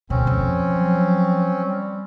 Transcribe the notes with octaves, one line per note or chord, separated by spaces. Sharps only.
B2 D3 C4 C#4
F2 F3
F#3
G3